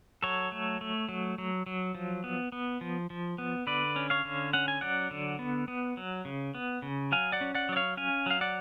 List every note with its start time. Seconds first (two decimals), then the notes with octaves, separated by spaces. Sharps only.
0.22 F#3 A4 C#5
0.52 A3
0.81 A3
1.09 F#3
1.38 F#3
1.66 F#3
1.95 F3
2.24 B3
2.52 B3
2.81 F3
3.10 F3
3.38 B3
3.67 D3 B4 D5
3.96 C#4
4.10 C#5 F5
4.25 D3
4.53 C#4 F#5
4.68 G#5
4.81 F#3 D5 F#5
5.11 D3
5.39 B3
5.68 B3
5.97 F#3
6.25 C#3
6.55 B3
6.82 C#3
7.12 F#3 F5 G#5
7.32 D5 F#5
7.41 C#4
7.55 D5 F#5
7.69 F#3 D5
7.76 C#5 F5
7.97 C#4 F5 G#5
8.26 F#3 F5
8.41 D5 F#5